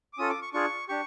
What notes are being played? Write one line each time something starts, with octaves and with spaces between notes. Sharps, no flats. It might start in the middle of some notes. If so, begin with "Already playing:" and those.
D6
C#4 F4 A4 D#6
D6
C#6
D4 F4 G#4 C#6
D4 G4 C#6